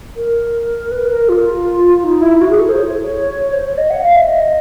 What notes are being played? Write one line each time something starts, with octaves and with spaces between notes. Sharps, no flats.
A#4
B4
A#4
F4
D#4
E4
F#4
G#4
A4
C5
C#5
C5
C#5
D#5
F#5
F5
E5
D#5